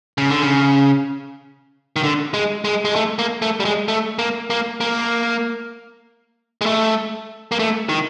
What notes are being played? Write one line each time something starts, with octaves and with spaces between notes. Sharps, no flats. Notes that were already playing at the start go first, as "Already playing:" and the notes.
C#3
D3
C#3
D#3
D3
G#3
G#3
G#3
A3
A#3
A3
G3
G#3
A3
A#3
A#3
A#3
G#3
A3
A#3
A3
D#3